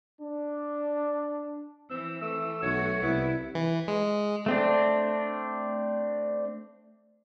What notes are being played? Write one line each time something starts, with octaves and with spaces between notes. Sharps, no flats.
D4
E3 C4 E6
A3 E6
B1 F#4 C#5
C2 B3 E4
E3
G#3
A3 C4 D4